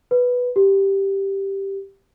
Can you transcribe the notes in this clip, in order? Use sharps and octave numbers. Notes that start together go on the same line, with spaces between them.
B4
G4